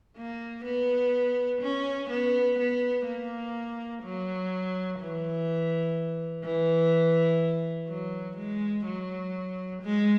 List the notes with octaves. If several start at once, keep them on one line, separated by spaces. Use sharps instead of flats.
A#3
B3
C#4
B3
B3
A#3
F#3
E3
E3
F#3
G#3
F#3
G#3